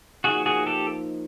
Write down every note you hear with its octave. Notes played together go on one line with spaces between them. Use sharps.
F3 A#3 D#4 F#4 G#4
F#4 G#4
G4 A4